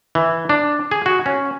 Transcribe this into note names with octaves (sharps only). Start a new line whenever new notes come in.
E3
D4
G#4
F#4
C#4